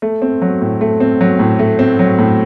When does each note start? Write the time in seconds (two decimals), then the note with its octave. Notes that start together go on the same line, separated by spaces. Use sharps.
0.02 A3
0.22 C4
0.42 F#3
0.61 A2
0.81 A3
1.00 C4
1.21 F#3
1.39 A2
1.59 A3
1.79 C4
1.99 F#3
2.18 A2